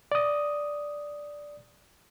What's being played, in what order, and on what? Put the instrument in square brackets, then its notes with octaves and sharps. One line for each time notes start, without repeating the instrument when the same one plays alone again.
[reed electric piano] D5 D#6